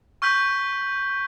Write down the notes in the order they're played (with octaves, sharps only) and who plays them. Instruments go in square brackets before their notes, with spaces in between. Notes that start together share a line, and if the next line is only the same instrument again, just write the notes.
[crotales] C#6 F6 G6 B6 F#7